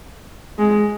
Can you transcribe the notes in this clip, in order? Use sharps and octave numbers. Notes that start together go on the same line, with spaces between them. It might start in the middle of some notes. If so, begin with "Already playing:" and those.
G#3